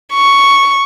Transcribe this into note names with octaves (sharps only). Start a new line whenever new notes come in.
C#6